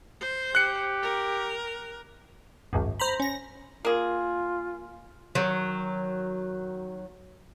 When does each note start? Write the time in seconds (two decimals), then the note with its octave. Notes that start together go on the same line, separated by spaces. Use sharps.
0.21 C5
0.55 G4 F#6 C#7
1.02 A#4
2.73 G#1 C#2 F#2
3.00 C5 A#5 B5
3.20 C#4 A#6
3.85 A#3 F4 G#4
5.35 D#3 F#3